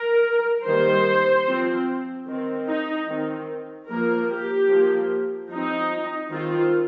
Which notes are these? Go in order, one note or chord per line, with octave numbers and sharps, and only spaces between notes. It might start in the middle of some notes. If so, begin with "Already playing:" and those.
Already playing: A#4
D#3 G3 A#3 C5
F3 C4
D#3 C4
D#4
D#3 C4
F3 A#3 A#4
G4
F3 A#3
F3 C4 D#4
D#3 C4 F4